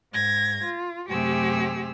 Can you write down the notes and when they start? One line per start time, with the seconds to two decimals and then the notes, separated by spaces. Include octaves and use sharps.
0.14 G#2 G#6 A#6
0.64 F4
1.09 F#2 C3 A3 G4 G#4 E6